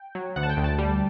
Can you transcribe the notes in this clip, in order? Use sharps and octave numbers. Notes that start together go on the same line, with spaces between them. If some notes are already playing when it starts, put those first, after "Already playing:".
Already playing: G5
F#3
D2 F#5
A5
G5
D2
A5
G3